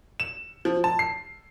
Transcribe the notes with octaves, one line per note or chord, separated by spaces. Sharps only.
E7
F3
A5
C7